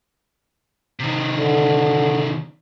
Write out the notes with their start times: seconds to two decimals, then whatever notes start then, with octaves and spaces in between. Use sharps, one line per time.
0.99 C3 D#3
1.38 D3